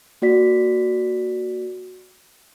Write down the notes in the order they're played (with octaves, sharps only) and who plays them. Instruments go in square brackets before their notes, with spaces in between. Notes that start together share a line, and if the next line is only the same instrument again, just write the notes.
[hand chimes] A#3 F#4 D5 B6